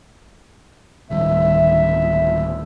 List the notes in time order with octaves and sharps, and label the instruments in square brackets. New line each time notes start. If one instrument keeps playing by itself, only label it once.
[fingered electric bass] D1 D#3 G3 [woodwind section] E5